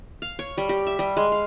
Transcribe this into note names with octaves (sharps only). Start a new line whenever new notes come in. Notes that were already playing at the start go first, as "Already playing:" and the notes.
F5
C#5
G3
G4
E5
G3
G#3
F5